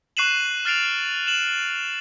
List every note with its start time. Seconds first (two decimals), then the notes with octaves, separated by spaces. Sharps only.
0.17 C#6 F#6 C7 D#7 E7 F#7
0.65 F6 A6 C7 D7 F7
1.27 E7 F#7